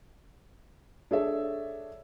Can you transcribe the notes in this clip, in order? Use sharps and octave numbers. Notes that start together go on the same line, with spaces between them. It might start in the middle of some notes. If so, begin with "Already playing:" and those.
D4 G#4 A4 C#5 D5 E5